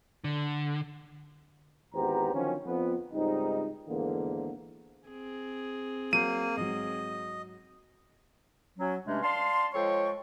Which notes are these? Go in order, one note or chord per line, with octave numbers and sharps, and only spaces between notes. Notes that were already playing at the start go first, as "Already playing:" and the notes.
D3
G#1 E2 B3 G4 C5 A#5
D3 D#3 F3 F#3 C4 C#4
F2 B3
C#2 G#2 G3 C4 D#4
E2 G#2 D3 D#3 A#3
C4 G#4
F#3 A#3 G6 C7 D#7
G#2 F#3 D#5
F#3 C#4
G2 C3 G#3 A3 C#4 D4
D5 F5 A5 C6
F3 G#3 A4 C#5 G5 C#6